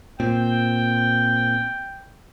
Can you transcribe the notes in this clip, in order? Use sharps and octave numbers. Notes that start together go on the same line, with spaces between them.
A#2 C4 G5